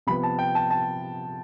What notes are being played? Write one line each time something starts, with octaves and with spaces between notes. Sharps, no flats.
C3 F3 B3 B5
A5
G5
A5
A5